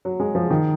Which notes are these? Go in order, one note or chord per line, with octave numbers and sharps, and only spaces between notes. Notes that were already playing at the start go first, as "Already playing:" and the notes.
F#3
G#3
F3
D#3